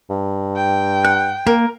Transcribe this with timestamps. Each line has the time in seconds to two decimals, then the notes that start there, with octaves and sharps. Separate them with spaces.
0.10 G2
0.57 G5
1.05 F#5 F#6
1.47 A#3 A#4